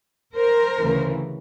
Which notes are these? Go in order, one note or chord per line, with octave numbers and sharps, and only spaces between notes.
A#4 C5
D2 C#3 E3